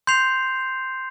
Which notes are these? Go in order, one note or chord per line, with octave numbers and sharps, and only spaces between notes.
C6 G6 C7 F7